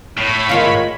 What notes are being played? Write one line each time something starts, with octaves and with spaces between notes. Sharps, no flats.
A2 C#5 B5
D#3 G#3 F4